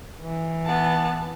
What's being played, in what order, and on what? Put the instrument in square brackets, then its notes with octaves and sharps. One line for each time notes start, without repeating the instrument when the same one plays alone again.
[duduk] E3
[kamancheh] B3 A5